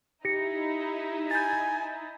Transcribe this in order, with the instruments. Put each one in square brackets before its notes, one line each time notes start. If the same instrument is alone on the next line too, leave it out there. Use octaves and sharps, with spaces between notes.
[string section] D#4 E4 [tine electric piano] G4 [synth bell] A#6 C#7
[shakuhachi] G#5 [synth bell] G6 A6